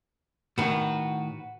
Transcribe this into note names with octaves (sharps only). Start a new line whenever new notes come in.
A2 D#3 F#4 B4